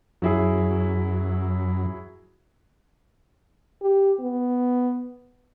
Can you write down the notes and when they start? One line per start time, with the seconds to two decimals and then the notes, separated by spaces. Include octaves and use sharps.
0.22 F#2 F#3 E4 G#4
3.82 G4
4.20 B3